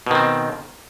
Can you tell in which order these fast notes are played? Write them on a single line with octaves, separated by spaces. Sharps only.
B2 D#3 C4